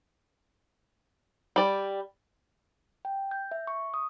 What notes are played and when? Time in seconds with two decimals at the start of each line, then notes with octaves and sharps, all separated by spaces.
1.56 G3 D5
3.05 G5
3.31 G6
3.51 E5
3.67 C#6
3.94 D#6